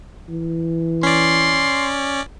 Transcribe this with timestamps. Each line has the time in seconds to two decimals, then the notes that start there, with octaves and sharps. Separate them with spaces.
0.28 E3
1.03 C#4 D5 C6